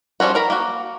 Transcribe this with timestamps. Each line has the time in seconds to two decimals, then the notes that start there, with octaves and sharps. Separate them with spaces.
0.20 F3 G3 C#4 F#4
0.35 A#4 A#5 B5
0.50 A#3 F#4